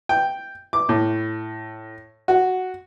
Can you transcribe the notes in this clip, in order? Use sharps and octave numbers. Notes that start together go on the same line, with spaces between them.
G5
D6
A2
F#4